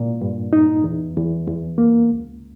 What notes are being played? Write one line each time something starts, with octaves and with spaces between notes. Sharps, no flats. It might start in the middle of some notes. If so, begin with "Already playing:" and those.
Already playing: A#2
G2
D#4
E2
E2
E2
A#3
C#2